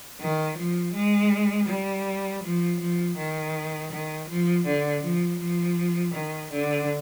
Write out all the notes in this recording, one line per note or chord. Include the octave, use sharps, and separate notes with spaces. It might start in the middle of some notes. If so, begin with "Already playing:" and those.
D#3
F3
G#3
G3
F3
F3
D#3
D#3
F3
D3
F3
F3
D#3
D3